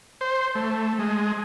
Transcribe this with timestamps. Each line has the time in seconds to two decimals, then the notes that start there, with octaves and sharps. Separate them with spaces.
0.21 C5
0.55 A3
0.99 G#3